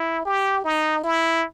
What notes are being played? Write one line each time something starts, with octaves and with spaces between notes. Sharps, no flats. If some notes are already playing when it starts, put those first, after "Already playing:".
Already playing: E4
G4
D#4
E4